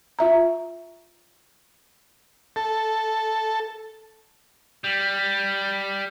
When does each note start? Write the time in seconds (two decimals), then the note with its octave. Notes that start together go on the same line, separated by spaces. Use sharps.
0.19 F4 E5 A#5
2.56 A4
4.84 G3